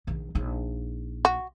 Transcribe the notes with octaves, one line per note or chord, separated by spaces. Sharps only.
A#1 D#3
A#1 D#4
F#4